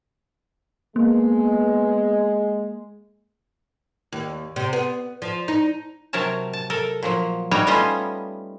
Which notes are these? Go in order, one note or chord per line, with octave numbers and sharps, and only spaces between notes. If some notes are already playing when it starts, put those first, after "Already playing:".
G#3 A#3 B3
D#2
C3
B3
F3
D#4
C3 F#3 A#4 C#5 A5
A5
A4 A#4
A#2 F3 F#3
G3 D#4 F#4 C#5 G5 A#5
G3 A3 B3 C#4 F4 D#5